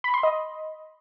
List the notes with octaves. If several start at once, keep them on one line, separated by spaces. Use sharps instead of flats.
B5
C6
D#5